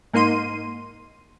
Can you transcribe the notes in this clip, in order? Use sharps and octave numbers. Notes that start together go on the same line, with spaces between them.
G#2 A#3 D#4 C6 D#7